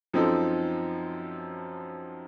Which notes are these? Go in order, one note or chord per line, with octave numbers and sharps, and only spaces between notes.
F#2 F3 C4 D#4 A4